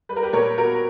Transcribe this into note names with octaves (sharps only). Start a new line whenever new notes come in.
G3 B4
A#4
G4 B4
A#2 A#4 C#5
B3 F#4 A#4